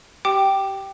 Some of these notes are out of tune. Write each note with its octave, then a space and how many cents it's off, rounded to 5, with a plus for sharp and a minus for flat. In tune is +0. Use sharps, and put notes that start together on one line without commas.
G4 -20 G5 -5 D6 +15